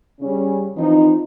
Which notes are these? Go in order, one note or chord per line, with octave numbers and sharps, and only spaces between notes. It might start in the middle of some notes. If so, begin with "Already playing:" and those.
C#3 G3 C#4
E3 F3 C4 D#4